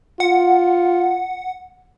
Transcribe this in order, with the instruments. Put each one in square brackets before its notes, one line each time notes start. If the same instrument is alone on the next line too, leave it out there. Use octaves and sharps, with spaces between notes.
[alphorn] F4 [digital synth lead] F#5